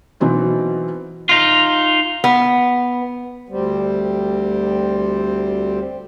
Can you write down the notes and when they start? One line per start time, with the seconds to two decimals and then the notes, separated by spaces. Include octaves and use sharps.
0.20 B2 E3 F#3 C4 D#4
1.29 D#4 F4
2.24 B3
3.49 D2 G3 C4